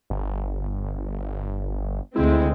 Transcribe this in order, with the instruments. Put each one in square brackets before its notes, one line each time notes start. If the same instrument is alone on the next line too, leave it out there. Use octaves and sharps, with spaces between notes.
[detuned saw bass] G1
[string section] D2 G#3 C4 [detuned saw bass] E4